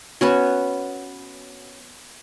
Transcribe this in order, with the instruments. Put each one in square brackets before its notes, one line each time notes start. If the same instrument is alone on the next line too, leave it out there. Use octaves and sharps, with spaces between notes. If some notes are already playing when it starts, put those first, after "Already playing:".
[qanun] B3 C#4 F#4